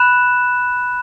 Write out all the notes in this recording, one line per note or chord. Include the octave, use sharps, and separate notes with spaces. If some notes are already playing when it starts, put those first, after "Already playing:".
Already playing: B5 F#6 E7